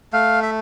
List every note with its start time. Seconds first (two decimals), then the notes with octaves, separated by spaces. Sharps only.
0.13 A3 F5
0.43 E5